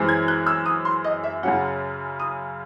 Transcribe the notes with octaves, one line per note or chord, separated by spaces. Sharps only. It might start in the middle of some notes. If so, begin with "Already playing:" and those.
Already playing: F#2 E3 G#3 C4
G#6
F#6
E6
D#6
C6
D#5
E5
F#2 C#3 F#3 C#4 F#5
D#6